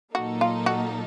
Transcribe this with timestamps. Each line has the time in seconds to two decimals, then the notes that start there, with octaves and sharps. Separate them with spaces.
0.14 A#2 F#3 A#3 D#4 F#4 A4
0.41 F4
0.66 F#4